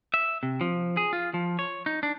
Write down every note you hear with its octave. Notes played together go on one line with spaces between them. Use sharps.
E5
C3
F3
G#4
F4
F3
C#5
D#4
D4